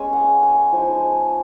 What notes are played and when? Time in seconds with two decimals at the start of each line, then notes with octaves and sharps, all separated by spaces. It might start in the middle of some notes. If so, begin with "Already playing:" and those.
Already playing: G#3 B3 C#4 G#5
0.13 F#5
0.43 G#5
0.72 F3 G#3 D#4